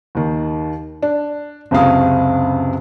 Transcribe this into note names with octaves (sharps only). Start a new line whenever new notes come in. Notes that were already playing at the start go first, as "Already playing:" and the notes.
D#2 D#3
D4
F#1 C#2 C3 F5 D#6